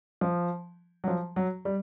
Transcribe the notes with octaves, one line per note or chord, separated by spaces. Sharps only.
F3
F#3
F3
F#3
G3